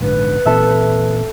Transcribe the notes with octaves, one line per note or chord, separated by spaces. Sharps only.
A#1 G#2 D3 B4
A#2 E3 C4 A4 E5